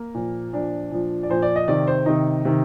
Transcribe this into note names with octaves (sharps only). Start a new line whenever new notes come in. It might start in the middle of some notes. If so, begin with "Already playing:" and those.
Already playing: A#3
A#2 F3
A#2 F3 D4
A#2 F3
D5
A#2 F3 C5
D5
D#5
C3 D#3 D5
C5
C3 D#3 D#4
C3 D#3